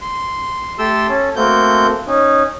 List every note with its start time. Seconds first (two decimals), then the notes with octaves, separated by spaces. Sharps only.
0.01 C6
0.78 A3 G4 A4 G5 C6 E6
1.09 C#4 A4
1.36 A3 A#3 C4 F#4 G6
2.07 C#4 D#4